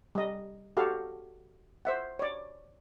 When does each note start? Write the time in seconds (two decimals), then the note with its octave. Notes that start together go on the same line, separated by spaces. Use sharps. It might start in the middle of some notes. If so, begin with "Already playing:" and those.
0.15 G3 D#5
0.77 F#4 G4 A4 F5
1.85 C5 E5 F#5
2.19 C#5 D5